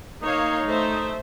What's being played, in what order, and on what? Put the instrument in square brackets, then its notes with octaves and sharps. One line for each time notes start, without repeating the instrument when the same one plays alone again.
[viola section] A#3 C#5 F5 [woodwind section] D#4
[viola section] A3 C5 E5